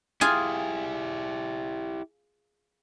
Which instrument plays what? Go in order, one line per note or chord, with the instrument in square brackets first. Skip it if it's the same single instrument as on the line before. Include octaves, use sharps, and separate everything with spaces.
[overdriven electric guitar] E4 G4 [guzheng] F4 G#4 G#5